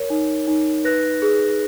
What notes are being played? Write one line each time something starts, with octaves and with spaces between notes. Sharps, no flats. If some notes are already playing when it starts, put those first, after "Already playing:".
Already playing: A#4 C#5
D#4
D#4
B4 F#6 A#6
G#4